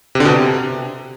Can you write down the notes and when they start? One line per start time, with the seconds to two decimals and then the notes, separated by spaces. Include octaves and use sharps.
0.15 C3
0.20 D3
0.25 B2
0.30 C3